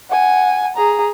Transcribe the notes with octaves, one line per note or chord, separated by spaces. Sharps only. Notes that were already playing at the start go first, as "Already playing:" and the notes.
F#5 G#5
G#4 A#5